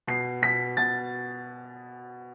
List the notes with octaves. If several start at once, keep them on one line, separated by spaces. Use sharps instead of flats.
B2 C7
B2 B6
B2 A6